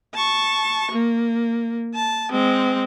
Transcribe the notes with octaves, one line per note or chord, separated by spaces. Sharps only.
A5 C#6
A#3
A5
G#3 C4